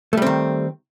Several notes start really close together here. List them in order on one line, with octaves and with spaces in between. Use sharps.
A3 G3 C4 D#3